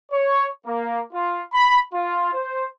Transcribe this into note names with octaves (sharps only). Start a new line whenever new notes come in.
C#5
A#3
F4
B5
F4
C5